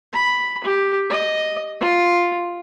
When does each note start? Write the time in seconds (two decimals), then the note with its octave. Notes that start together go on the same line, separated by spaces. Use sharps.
0.13 B5
0.64 G4
1.10 D#5
1.80 F4